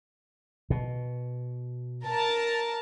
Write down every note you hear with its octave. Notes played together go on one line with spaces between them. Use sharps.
B2
A#4 A5